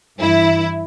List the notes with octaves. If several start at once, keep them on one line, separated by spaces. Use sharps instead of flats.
G2 E3 E4